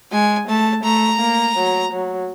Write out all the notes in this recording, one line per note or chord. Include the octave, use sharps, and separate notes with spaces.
G#3 G#5
A3 A5
A3 A#5
A#3
F#3
F#3